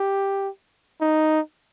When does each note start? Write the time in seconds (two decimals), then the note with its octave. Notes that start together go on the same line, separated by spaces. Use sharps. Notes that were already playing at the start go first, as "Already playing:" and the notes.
Already playing: G4
1.01 D#4